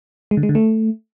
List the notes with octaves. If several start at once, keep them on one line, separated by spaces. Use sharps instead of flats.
G#3
D3
G#3
D3
A3